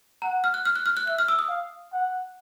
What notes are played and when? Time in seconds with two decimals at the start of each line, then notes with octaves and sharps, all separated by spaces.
0.22 F#5 A#5
0.44 F6
0.54 F#6
0.65 F6
0.76 F#6
0.86 F6
0.97 F#6
1.07 E5 F#6
1.18 F6
1.28 E6
1.39 D#6
1.49 F5
1.93 F#5